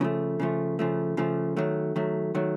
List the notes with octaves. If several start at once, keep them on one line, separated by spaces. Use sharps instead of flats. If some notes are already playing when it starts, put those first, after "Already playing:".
C#3 F3 A3
C#3 F3 A3
C#3 F3 A3
C#3 F3 A3
D#3 F#3 A3
D#3 F#3 A3
D#3 F#3 A3